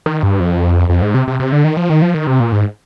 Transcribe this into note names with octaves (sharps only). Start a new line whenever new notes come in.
D#3
G2
F2
F2
G#2
C3
C3
C3
D3
D#3
F3
D#3
F3
D#3
C3
A#2
G#2